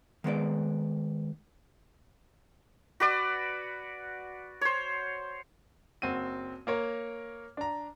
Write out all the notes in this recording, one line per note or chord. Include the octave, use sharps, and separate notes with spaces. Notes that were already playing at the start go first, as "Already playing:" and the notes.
D#3 G#3 B3 D5
F#4 B4 D5
C5 C#5
F#1 C4 F#4 D#7
A#3 A#4 C#5
D4 A#5